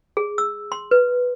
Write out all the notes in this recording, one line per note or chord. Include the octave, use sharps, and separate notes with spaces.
G#4
E6
C6
B4